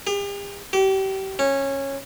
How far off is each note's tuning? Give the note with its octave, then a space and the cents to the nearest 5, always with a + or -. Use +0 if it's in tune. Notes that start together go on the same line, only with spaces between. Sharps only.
G4 +45
G4 -30
C#4 -15